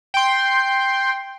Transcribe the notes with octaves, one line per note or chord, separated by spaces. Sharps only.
G5 C6